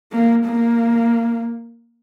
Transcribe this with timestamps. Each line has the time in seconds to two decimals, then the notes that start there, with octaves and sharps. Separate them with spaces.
0.12 A#3
0.45 A#3